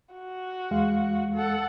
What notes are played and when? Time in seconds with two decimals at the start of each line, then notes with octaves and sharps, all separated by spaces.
0.15 F#4
0.71 E2 G#3 F5
1.35 A4 F#5